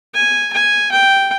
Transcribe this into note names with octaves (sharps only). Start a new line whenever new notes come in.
G#5
G#5
G5